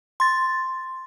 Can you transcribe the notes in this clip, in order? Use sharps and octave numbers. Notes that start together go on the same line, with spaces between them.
C6 A6